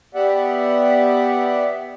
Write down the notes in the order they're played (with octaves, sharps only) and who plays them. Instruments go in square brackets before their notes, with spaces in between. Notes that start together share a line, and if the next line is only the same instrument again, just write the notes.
[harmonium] B3 G4 D5 E5 F#5